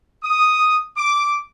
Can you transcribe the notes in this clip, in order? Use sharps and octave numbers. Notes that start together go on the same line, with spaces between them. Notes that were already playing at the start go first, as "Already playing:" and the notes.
D#6
D6